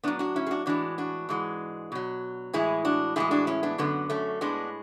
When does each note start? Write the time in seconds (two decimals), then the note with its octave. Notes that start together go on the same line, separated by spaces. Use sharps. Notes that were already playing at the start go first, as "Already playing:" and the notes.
0.04 A2 F#3 B3 D4
0.19 D4 F#4
0.36 C#4 E4
0.46 G#4
0.51 D4 F#4
0.66 A2 E3 G#3 D4 F#4
0.98 D4 F#4
1.29 G#2 E3 G#3
1.92 B2 F#3
2.53 A2 E3 G#3 E4 G#4
2.85 D4 F#4
3.16 A2 E3 G#3 E4 G#4
3.31 D4 F#4
3.47 C#4 E4
3.63 B3 D4
3.78 F#2 D3 G#3 B3
4.10 A3 C#4
4.41 A2 G#3 B3 D4